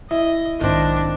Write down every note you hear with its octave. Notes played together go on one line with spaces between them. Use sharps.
E4 D#5
B1 G#2 D#3 C4 D4 A#6